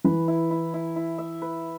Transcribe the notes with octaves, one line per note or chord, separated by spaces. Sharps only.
E3 B4
E4
E4
E4
E4
E5
B4